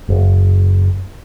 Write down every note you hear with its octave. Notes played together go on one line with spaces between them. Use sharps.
F#1